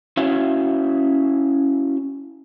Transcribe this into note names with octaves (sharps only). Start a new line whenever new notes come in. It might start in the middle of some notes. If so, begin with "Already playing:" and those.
C#4 E4 F#4 C#5 E5 F5